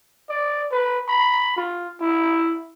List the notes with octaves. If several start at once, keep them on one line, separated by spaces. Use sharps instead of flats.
D5
B4
B5
F4
E4